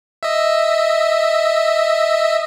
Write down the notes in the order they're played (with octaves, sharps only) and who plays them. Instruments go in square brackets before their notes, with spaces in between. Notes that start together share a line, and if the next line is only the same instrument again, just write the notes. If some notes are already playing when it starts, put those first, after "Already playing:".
[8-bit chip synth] D#5 E5